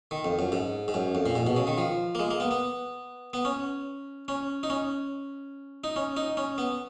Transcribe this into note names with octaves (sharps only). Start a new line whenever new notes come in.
D#3
F2
F#2
G#2
G#2
F#2
F2
A#2
G#2
B2
C#3
D#3
F3
A#3
G#3
A#3
B3
B3
B3
C#4
C#4
D#4
C#4
D#4
C#4
D#4
C#4
B3